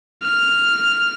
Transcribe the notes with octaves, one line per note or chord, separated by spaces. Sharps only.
F6